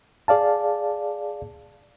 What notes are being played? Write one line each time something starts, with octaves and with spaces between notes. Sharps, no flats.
G#4 D5 F5 A5